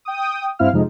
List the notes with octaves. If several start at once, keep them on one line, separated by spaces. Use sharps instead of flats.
G5 D#6
G2 C4 E4 F5 F6
F2 C3 F3 G#3 D#4